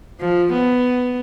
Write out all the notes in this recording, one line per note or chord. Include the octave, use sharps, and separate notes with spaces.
F3
B3